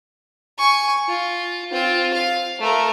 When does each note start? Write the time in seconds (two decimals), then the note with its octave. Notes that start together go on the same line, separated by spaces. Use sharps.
0.58 G#5 C#6
1.08 F4
1.71 C4 F4
2.14 F5
2.60 A3 A#4